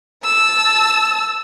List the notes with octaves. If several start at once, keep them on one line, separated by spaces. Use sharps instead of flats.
A5 E6